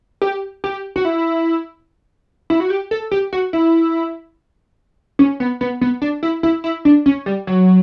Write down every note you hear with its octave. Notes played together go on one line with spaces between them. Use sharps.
G4
G4
F#4
E4
E4
F#4
G4
A4
G4
F#4
E4
C#4
B3
B3
B3
D4
E4
E4
E4
D4
C#4
G3
F#3